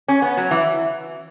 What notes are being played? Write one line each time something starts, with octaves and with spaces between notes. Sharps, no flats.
C#4
B3
F#3
E3